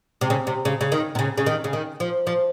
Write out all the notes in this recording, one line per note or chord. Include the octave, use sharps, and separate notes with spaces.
C3
C#3
C3
C#3
C#3
D#3
C3
C#3
C#3
D#3
C#3
D#3
F3
F3